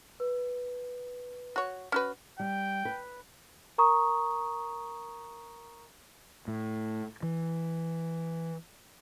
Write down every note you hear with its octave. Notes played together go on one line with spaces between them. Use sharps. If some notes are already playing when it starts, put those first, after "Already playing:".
B4
F#4 C#5
C#4 F#4 B4
G3 G5
B4
A#4 A#5 C#6 D#6
A2
E3